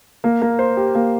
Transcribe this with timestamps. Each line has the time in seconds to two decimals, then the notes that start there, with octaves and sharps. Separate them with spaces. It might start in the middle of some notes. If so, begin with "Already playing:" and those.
0.24 A#3
0.42 A#3
0.59 C5
0.77 G4
0.95 A#3